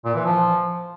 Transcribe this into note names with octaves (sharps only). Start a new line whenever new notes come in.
A#2
E3
F3